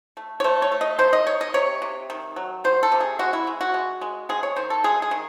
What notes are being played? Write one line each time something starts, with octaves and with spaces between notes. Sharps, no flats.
A3
C#5
A3 C5
C#5
A3
D#5
D#3 C5
D#5
D#3 C#5
D#5
C3 C#5
C3
D#3
F#3
D#3 C5
A4
C3
G#4
G#3 F#4
E4
G#3
F#4
G#3
G#3
G#3 G#4
C#5
D#3 C5
A4
G#3 G#4
G#4
D#3